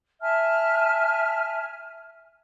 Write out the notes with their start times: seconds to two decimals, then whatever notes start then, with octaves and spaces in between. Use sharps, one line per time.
0.21 E5 G#5 A5 F6